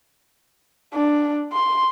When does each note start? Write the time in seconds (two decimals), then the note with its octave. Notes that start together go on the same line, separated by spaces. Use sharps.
0.94 D4
1.53 C6